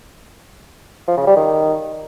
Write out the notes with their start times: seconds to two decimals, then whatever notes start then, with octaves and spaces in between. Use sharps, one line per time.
1.08 F3
1.17 C#3
1.27 G3
1.36 D#3